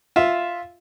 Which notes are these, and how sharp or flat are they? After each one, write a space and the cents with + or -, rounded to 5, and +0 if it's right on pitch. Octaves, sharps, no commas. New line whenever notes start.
F4 +0 E5 +0